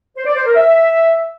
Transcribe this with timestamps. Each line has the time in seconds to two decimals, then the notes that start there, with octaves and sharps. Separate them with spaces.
0.17 C5
0.26 D5
0.36 C5
0.45 A#4
0.55 E5